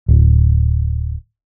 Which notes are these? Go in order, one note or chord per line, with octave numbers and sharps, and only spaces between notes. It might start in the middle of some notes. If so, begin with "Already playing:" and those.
D1